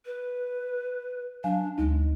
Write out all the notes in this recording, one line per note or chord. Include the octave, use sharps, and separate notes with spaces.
B4
F#3 D4 F5 G#5
D2 G#3 D#4